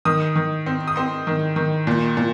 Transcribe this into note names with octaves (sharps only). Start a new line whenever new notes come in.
D#3 D#6
D#3
C4
D#6
C4 C6
D#3
D#3
A#2
A#2